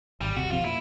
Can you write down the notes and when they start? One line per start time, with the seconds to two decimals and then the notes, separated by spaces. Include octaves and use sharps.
0.21 G#1 G3
0.37 D#1 C3 F#4
0.51 A#1 F2 C3 F4
0.65 A#2 E4